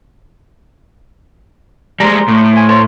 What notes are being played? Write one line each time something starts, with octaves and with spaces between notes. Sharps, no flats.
G3 G#3 C5 A#5
A2
C5 G#5
C5 C#5 A5